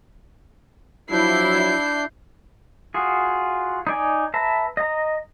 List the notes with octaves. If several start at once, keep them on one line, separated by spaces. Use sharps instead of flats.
F3 F#3 D4 E4 G6 C7
F4 F#4 G#4
D#4 D5 G#5
B4 E5 A5 A#5
D#5 A#5